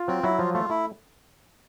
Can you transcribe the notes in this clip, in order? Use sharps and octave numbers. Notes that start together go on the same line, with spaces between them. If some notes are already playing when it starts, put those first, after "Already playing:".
Already playing: F4
F#3 C4
F#3 E4
F3 F4
A3 F4
A3 E4